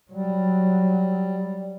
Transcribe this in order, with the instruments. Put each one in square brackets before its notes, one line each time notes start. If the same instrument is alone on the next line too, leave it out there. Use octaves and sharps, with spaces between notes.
[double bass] F#3 [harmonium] G3